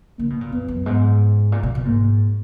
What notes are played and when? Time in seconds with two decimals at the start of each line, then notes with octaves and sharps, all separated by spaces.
0.18 D3 A#3
0.30 B2
0.41 A#2
0.52 F2 B3
0.68 F#2
0.86 G#2
1.52 A#2
1.63 B2
1.75 B2
1.85 G#2 A#3